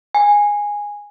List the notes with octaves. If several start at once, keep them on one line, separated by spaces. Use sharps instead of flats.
G#5